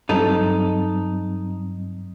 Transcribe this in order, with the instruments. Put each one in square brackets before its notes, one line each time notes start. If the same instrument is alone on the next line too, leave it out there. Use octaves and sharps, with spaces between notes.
[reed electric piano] G2 F#3 C4 [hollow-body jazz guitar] D#4 A4